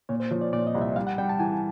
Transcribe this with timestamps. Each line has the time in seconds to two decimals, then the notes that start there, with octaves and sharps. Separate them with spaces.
0.09 A#2 C#5
0.20 C5
0.31 F3 C#5
0.41 D5
0.53 A#2 D5
0.67 D#5
0.75 C2
0.81 E5
0.96 G3 F5
1.07 F#5
1.18 G3 G5
1.29 A5
1.40 E3 G#5